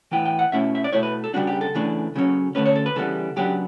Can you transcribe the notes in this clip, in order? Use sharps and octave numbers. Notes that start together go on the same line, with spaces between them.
A2 E3 B3 E4 G5
G5
F#5
B2 A3 C#4 E4 E5
E5
D5
B2 A3 E4 C#5
B4
A4
C#3 G3 B3 D4 F#4
G4
A4
C#3 E3 A3 D4
C#3 F#3 C#4
D3 A3 C#4 B4
C#5
A4
B4
C#3 E3 G3 B3 A4
C#3 F#3 B3 D4 G4